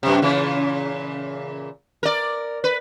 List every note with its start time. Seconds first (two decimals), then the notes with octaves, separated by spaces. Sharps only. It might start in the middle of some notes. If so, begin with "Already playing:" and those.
0.03 F#2 C3
0.22 A#2 C#3 E3
2.03 A#4 D5
2.64 B4